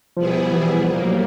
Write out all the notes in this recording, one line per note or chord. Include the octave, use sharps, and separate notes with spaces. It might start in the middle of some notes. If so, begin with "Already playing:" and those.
B2 F3 G3 B3 E4 G#4
E3
A#2 F3 G3 A#3
F#3